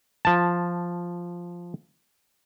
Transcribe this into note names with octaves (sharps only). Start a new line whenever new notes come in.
F3 A5